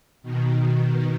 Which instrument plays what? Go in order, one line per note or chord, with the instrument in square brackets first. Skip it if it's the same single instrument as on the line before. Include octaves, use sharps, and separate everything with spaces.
[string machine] B2 D#3